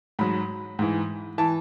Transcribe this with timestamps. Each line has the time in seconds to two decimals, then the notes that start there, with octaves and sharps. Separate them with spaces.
0.19 G#2 F#3 B5
0.79 G#2 E3
1.38 E3 A5